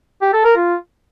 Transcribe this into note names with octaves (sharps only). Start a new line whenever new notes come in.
G4
A4
A#4
F4